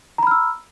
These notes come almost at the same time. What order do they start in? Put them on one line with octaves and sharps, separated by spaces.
A#5 B5 F6 E6